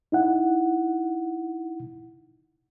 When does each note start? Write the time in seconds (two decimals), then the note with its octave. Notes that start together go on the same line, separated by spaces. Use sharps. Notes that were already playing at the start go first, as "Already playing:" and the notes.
0.12 D#4 E4 F#5